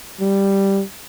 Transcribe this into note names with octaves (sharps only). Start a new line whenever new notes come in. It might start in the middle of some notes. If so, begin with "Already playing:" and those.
G3